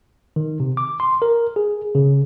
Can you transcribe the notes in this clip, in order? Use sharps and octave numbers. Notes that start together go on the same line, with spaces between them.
D#3
C3
D6
C6
A#4
G#4
C#3